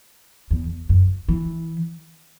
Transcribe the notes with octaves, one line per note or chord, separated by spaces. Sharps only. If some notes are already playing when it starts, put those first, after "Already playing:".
E2
F#2
E3